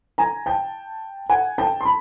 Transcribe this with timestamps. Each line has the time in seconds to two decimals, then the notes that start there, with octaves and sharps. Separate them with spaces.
0.18 G#5 A#5
0.46 G5 A5
1.30 F#5 G#5
1.58 G5 A5
1.81 C6
1.85 A5 B5